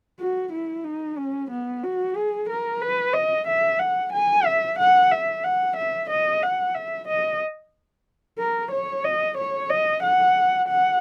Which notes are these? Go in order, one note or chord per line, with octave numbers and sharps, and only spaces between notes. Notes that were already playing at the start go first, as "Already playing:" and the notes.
F#4
E4
D#4
C#4
B3
F#4
G#4
A#4
B4
D#5
E5
F#5
G#5
E5
F#5
E5
F#5
E5
D#5
F#5
E5
D#5
A#4
C#5
D#5
C#5
D#5
F#5
F#5